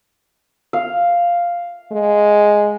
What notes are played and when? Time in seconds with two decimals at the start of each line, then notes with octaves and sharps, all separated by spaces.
0.73 F5
1.92 G#3